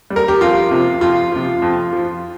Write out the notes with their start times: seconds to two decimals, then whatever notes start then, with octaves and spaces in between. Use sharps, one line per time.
0.10 G3
0.16 A#4
0.28 G4
0.41 F2 F4
0.71 C3 F3
1.01 F2 F4
1.32 C3 F3
1.62 F2
1.93 F3